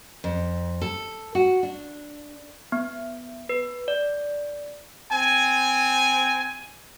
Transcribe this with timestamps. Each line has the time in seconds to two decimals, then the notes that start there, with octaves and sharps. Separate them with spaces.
0.24 F2
0.82 A4
1.35 F#4
1.63 D4
2.72 B3
3.49 B4
3.88 D5
5.11 C4 G#5